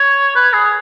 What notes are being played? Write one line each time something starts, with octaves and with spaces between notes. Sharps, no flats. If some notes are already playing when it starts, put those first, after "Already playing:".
Already playing: C#5
B4
G#4